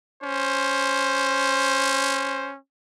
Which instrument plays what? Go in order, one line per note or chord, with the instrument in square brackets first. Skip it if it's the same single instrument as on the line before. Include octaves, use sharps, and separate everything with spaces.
[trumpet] C#4 [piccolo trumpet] C5